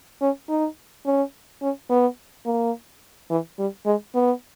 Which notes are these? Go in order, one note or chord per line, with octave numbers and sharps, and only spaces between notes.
C#4
D#4
C#4
C#4
B3
A#3
E3
G3
G#3
B3